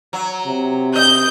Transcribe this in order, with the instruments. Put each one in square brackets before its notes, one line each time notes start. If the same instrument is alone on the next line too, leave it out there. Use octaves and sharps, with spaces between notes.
[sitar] F#3
[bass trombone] C3
[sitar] D#5 [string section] G6